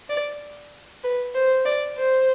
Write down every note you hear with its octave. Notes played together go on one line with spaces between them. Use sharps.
D5
B4
C5
D5
C5